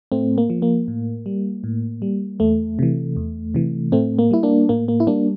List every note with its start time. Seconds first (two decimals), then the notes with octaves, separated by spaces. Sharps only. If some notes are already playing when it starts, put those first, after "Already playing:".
0.12 A2 A3 C4
0.38 A#3
0.50 F3
0.62 A#3
0.88 A2
1.26 G3
1.64 A2
2.02 G3
2.40 E2 A3
2.79 C3 E3
3.16 E2
3.54 C3 E3
3.92 A2 A3 C4
4.19 A#3
4.31 G3 E4
4.43 A#3 D4
4.69 A2 A#3
4.88 A#3
5.00 E4
5.07 G3 A#3 D4